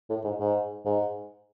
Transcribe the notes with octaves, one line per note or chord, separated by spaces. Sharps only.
A2
G#2
G#2
G#2